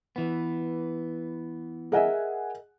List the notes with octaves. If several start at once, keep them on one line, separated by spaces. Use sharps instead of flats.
E3 B3
G#4 A#4 D#5 E5 F#5 G#5